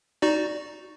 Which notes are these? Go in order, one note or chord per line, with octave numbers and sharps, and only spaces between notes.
D#4 F#4 D5